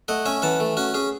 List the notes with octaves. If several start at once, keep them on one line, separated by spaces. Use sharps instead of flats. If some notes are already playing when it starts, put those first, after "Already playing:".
A3 D#5 F#5
C#4 E5 G#5
E3 F#5 A5
A3
C#4 F#4
C#4 G#4